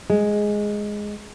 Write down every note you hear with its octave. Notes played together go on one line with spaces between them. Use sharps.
G#3